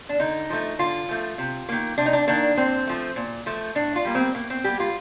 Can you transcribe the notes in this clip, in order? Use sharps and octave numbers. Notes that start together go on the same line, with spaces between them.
D4
D3 D#4
F3 A3
D3 F4
F3 A3
C3
D#3 A#3
C3 D4
D#4
D4
D#3 A#3 D4
A#2 C4
F3 A3
A#2
F3 A3
A2 D4
F4
G3 A#3
C4
A2 A#3
C4
G3 A#3 G4
F4